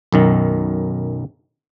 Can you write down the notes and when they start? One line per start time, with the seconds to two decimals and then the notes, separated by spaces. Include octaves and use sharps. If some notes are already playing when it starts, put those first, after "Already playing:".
0.12 B1 F#2 D#3